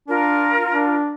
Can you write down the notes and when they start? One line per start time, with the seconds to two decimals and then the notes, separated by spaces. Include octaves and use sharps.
0.08 D4 F4 A#4
0.74 D4